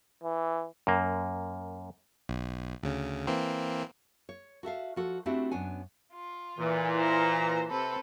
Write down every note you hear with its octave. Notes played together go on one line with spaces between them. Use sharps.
E3
F#2 A#3
B1
D2 C#3
E3 A#3 C4
C#5
F#4 A4 E5 F5
F3 F#4 A4
A3 C4 D4 E4 F#4 G4
F#2 B3 D4 C#5 G#5
F4
A#2 E3
C5 A#5
C3 C4 A4 B4